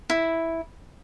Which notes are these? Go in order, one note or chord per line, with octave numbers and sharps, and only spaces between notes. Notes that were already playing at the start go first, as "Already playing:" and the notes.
E4